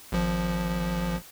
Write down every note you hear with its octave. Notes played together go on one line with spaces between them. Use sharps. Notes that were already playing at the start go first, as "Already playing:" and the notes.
G#1 F3